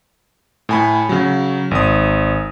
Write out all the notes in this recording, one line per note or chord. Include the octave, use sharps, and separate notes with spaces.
A2 G#5 B5
C#3 F#3
G#1 D#6